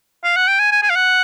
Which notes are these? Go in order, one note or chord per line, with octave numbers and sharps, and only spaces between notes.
F5
F#5
G5
G#5
G#5
G#5
F5
F#5